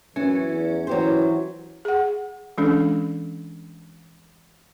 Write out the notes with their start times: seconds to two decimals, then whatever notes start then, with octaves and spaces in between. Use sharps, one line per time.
0.16 F#2 E3 C#4
0.46 E2
0.87 E3 F#3 G4 C5
1.85 G#4 F#5
2.58 E3 G#3 C#4 D4 A4